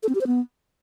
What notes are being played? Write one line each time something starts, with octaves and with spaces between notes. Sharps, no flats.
A4
C4
G4
C5
B3